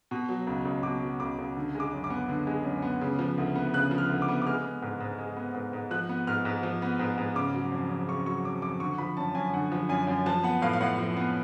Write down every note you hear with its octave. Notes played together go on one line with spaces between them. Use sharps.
B2
F#3
C#2
C#2
B2 D6
F#3
C#2 D6
C#2
D3
G#3 D6
F#2
D6
B3
D3
G#3
F#2
B3
C#3
F3
D2
B3
C#3 F#6
F3
F6
D2
D6
B3
D6
G#3 F6
B3
G#2
G#2
G#3
B3
G#2
G#2
F3 F#6
B3
G#2 F6
G#2
F3
B3
G#2
G#2
C#3 D6
F#3
F2
F2
C#3 C#6
F#3 C#6
F2 D6
F2 D6
D3 C#6
F3 B5
F#2 A5
F#2 G#5
D3 F#5
F3
F#2 G#5
F#2
F3 A5
B3 F#5
A2 F5
F5
A2 F#5
F3
B3